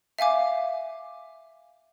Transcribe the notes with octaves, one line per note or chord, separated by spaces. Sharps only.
E5 F5 G#5 D6